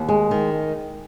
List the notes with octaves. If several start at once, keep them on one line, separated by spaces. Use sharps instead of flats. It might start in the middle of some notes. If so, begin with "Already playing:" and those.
Already playing: D#2
G#3
D#3